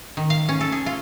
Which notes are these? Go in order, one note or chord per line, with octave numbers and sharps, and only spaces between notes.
D#3
F5
C#4
A4
G#4
F4